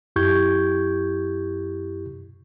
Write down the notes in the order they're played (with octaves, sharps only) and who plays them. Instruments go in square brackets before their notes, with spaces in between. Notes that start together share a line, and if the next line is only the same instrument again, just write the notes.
[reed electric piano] F#2 E4 G4 C#6 G6 G#6